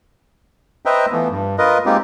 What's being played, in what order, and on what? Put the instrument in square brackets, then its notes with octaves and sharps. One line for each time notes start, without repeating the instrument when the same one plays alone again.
[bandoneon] B4 C5 D#5 E5 G5 A#5
E3 F3 A3 B3
G2
F4 A#4 B4 D#5
G#3 A#3 C4 D#4 F4 G4